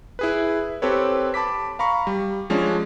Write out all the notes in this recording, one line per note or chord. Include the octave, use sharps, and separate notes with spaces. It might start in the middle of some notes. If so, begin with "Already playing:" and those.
E4 G#4 B4
C4 G4 A4 B4 C#5
A5 B5 D6 B6
F5 A#5 B5 C#6
G3
F3 G#3 C#4 D4